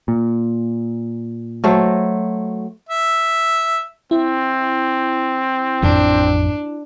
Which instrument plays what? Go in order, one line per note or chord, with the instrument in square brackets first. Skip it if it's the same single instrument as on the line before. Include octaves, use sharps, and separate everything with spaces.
[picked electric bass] A#2
[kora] F#3 A3 C5
[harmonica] E5
[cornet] C4 [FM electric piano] E4
[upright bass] A1 F2 [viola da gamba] D4